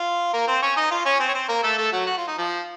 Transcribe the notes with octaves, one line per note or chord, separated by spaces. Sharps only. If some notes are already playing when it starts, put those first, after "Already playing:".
Already playing: F4 F5
A#3 A#4
C4 C5
C#4 C#5
D#4 D#5
F4 F5
C#4 C#5
C4 C5
C#5
C4 C5
A#3 A#4
A3 A4
A3 A4
F#3 F#4
F#4
F4
D#4
F3 F4